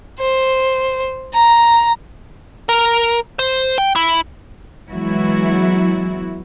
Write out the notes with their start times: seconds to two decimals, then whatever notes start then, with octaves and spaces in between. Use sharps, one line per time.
0.19 C5
1.33 A#5
2.69 A#4
3.39 C5
3.78 G5
3.96 E4
4.90 E3 F#3 G#3 B3 E4 F#4